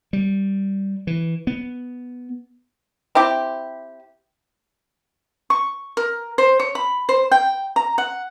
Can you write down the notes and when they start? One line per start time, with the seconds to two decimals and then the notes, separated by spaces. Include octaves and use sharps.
0.13 G3
1.07 E3
1.47 B3
3.15 C4 E4 G4
5.50 C#6
5.97 A#4
6.38 C5
6.60 C#5
6.75 B5
7.09 C5
7.31 G5
7.76 A#5
7.98 F#5